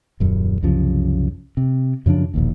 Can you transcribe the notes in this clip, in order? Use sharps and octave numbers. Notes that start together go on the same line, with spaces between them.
D#1 F#2
C2 F#2 C#3 F3
C3
F#2 C#3 F3 D4
E1 A#1 D#2